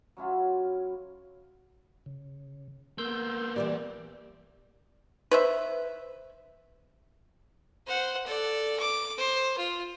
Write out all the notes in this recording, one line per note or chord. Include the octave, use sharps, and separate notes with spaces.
F#3 C#4 E4 F4
C#3
A#3 B3 C6 E6 G6
E3 G3 G4 D5
B4 C5 E5
C5 F#5
A4 D5
D6
C5
F4